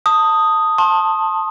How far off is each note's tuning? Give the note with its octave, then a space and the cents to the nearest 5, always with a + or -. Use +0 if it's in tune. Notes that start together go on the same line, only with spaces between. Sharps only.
A5 +20 D#6 +0
A5 +5 C6 +30